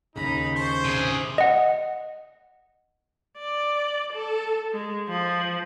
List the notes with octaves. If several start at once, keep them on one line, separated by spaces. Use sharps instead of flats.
D#2 A2 C#3 D#4 A#5 B5
C5 A5 C#6
C3 D4 G#4
D#5 F#5
D5
A4
G#3
F3